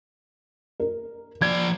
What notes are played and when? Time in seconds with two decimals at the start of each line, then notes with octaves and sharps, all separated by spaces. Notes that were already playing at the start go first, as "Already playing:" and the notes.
0.80 A#4
1.42 F3 D5 G#6